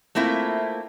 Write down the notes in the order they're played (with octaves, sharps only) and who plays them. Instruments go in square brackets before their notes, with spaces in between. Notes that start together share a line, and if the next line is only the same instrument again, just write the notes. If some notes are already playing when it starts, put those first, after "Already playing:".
[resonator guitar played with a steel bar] A3 A#3 C4 E4 F4